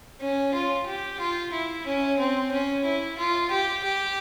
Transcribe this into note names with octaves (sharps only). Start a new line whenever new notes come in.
C#4
F4
G4
F4
E4
C#4
C4
C#4
E4
F4
G4
G4